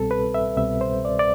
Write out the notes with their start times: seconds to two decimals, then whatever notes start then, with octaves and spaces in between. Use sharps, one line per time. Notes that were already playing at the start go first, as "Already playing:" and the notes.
Already playing: C2 B2 G3 C4 A4
0.11 B4
0.34 E5
0.57 C2 B2 G3 C4 E5
0.81 C5
1.05 D5
1.19 D5